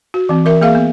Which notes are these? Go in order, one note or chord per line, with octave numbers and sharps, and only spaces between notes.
F#4
E3 C4
E3 A#4 E5
A#3 G#4 E5 F5
B3